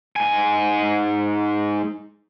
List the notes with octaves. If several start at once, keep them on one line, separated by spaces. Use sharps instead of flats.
G#2 G#5